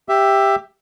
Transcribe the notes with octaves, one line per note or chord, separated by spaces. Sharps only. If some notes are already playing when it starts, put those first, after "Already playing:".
G4 E5